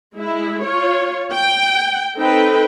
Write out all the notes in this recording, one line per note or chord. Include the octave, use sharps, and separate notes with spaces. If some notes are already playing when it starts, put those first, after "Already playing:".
G#3 E4
F4 C#5
G5
C4 D#4 A4 B4 G5